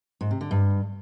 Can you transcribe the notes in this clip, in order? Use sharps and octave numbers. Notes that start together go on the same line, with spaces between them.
G#2
C3
D3
G2